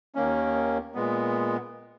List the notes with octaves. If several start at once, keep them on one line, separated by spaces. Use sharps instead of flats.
D#2 D#3 A#3 C#4
A#2 G#3 B3